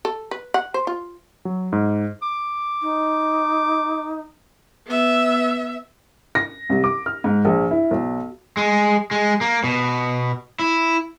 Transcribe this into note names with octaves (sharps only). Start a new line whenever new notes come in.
A4
B4
F#5
C5
F4
F#3
G#2
D6
D#4
B3 E5
A#6
C2
D6
F6
G#2
A#1
E4
B1
G#3
G#3
A#3
B2
E4